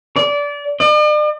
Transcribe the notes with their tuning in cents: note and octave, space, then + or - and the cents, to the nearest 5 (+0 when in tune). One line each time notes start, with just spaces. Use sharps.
D5 -25
D5 +45